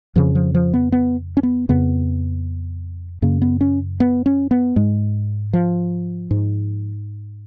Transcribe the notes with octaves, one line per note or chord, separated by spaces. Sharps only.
F2 C#3 F3
F3
F3
B3
B3
C#4
B3
F2 C#3 B3
F#2 C#3 A#3
B3
C#4
B3
C#4
B3
G#2 G#3
F3
G#2